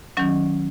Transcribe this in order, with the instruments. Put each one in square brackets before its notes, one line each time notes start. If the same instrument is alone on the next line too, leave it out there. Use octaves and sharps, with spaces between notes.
[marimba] D#3 F#3 C#4